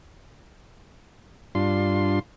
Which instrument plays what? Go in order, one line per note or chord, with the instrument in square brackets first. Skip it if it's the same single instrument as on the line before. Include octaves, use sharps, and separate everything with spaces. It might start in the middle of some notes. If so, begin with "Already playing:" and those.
[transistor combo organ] G2 D4 F4 C6